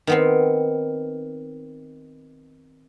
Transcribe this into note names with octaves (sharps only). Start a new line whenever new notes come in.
D#3 B3 C4